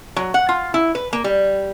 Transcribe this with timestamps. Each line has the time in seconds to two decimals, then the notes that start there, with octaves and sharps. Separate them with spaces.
0.16 F#3
0.34 F#5
0.49 F4
0.74 E4
0.95 B4
1.13 A#3
1.24 G3